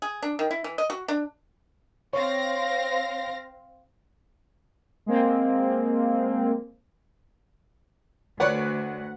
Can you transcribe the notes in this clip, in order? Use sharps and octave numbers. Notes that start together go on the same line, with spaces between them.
G#4
D4
D#3
E4
E3
D#5
F#4
D4
C4 C#5 F5 A#6
G#3 A#3 C4
D2 B4 C#5 D5 F#5